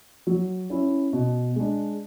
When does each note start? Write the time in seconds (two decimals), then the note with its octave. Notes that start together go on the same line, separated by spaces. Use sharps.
0.27 F#3
0.70 C#4 E4
1.13 B2
1.56 G#3 D4